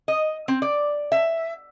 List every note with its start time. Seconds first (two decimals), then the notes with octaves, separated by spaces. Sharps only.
0.08 D#5
0.48 C4
0.62 D5
1.12 E5